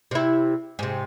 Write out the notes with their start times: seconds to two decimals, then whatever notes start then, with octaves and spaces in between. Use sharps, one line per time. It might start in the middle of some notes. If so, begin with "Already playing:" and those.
0.11 C3 E4
0.79 G#2 C3